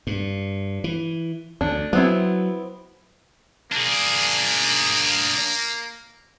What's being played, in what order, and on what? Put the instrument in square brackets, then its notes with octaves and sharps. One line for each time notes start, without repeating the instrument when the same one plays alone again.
[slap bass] G2
E3
[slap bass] D2 [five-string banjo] D4
[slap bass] F#3 [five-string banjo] B3 C4 E4
[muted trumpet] A#3 [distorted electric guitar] D4 G#4